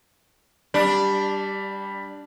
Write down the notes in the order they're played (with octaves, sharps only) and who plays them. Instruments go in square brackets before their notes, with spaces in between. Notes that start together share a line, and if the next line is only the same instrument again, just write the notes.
[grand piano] G3 [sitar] D4